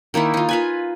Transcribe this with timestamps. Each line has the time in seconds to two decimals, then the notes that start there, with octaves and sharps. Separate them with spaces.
0.14 D#3 A#3 D#4 E4
0.34 D#4 F4
0.49 F4 B4 G#5